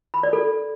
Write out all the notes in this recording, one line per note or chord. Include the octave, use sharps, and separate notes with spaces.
B5
D5
A4